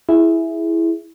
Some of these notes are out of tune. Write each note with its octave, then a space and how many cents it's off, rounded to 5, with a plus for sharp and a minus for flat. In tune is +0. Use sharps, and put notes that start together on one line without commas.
E4 +0 G#4 +0